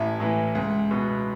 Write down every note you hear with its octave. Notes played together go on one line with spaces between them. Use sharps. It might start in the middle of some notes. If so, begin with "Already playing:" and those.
Already playing: A1 E4
A2 E3
C#2
B2